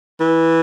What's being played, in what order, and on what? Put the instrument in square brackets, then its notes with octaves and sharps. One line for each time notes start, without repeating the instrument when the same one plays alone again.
[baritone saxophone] E3